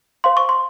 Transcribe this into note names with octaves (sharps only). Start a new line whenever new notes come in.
C5 F5 C6
C#6
C6